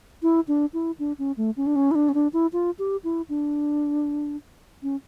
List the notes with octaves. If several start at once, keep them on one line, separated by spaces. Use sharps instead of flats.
E4
D4
E4
D4
C#4
A3
C#4
D4
C#4
E4
D4
C#4
D4
E4
F4
G4
E4
D4
C#4